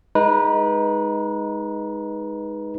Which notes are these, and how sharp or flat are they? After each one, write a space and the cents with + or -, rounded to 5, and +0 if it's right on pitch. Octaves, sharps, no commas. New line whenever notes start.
G#3 +0 D#4 +10 B4 -20